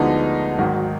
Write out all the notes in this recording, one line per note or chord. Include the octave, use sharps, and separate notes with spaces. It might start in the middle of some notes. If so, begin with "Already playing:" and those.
Already playing: D2 D3 F3 G#3 B3 D#4
G#1 G#2 D#3 F#3